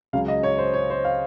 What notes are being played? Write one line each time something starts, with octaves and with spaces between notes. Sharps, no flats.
C#2 C#3 F#3 F5
D#5
C#5
C5
C#5
C5
F5